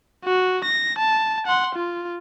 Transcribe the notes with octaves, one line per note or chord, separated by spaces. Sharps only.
F#4
A#6
A5
F#5 C6
F4